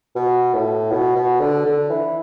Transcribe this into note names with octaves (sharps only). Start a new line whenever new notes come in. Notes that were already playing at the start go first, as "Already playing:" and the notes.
B2
A2
B2
B2
D3
D3
E3